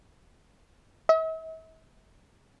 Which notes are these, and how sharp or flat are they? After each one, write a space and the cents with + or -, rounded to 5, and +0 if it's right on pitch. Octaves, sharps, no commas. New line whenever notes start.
E5 -45